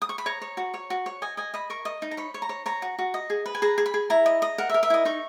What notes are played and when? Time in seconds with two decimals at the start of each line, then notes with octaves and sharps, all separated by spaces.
0.02 D#6
0.09 C#6
0.18 B5
0.26 C#5 A#5
0.42 C#5
0.57 F#4
0.74 C#5
0.90 F#4
1.06 C#5
1.22 D#5 G#5
1.37 D#5 G#5
1.54 D#5 B5
1.70 A#4 C#6
1.85 D#5
2.02 D#4
2.11 A#5
2.17 C#5 B5
2.34 C#5
2.42 A#5
2.49 C#5
2.66 C#5 A#5
2.82 F#4
2.99 F#4
3.14 D#5
3.30 G#4
3.46 B4
3.55 G#5
3.62 G#4 A#5
3.78 G#4
3.86 B5
3.94 G#4
4.10 E4 A#5
4.26 D#5
4.42 D#5
4.58 A#4 F#5
4.70 E5
4.74 A#4
4.83 E5
4.90 E4 D#5
5.05 D#4 C#6